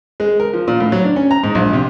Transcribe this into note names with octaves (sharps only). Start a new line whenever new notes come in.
G#3
A#4
F3
A#2
A2
F#3
D4
C#4
A#5
G#2
A#1
C3